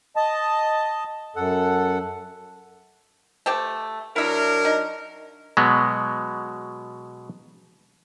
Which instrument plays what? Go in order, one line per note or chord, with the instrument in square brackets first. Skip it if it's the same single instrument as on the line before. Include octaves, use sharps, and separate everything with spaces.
[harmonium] D#5 A5
F#2 A4 F#5
[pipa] A3 G4 C5
[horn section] F#3 D4 A#4 [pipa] E4 E5
[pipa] D#4
[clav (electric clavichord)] B2 F#3 G#3 B3